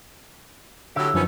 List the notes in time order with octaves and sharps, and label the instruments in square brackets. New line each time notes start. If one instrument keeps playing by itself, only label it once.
[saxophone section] A2 F#3 G4 [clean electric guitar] D3 E5
[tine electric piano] F#2 F3 [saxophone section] B3 C#4 D#4